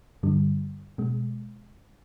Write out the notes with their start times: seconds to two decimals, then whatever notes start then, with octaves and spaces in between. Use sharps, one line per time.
0.23 G2 D3 G3
0.98 B2 G#3